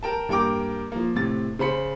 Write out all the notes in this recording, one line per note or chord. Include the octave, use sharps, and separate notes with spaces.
A#4 G5 A5
G2 A#3 A#4 G5 D6
F3 A#3
A2 C3 A6
C#3 C5 B5 C#7